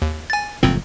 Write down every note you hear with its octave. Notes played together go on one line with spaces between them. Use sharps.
D#2
G#5 A6
F#1 A2 F3 C4